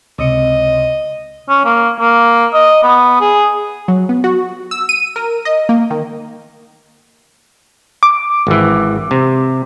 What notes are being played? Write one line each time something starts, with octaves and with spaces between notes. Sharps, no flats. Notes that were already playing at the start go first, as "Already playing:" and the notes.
C#2 C3 D#5
C#4
A#3
A#3
D#5
B3
G#4
F#3
B3
F#4
E6
D#7
A#4
D#5
A#3
D#3
D6
G#1 E3
C3